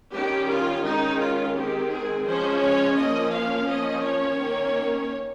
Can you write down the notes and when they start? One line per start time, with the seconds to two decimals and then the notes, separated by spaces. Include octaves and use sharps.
0.13 D#3 G3 C#4 G4
0.49 F4
0.84 D#3 G#3 C#4 D#4
1.19 F4
1.54 D#3 G#3 C4 G4
1.89 G#4
2.25 F3 G#3 C#4 C5
2.60 C#5
2.96 F3 A#3 C#4 D#5
3.31 F5
3.66 F3 A#3 C#4 D#5
4.02 C#5
4.38 D#3 A#3 C#4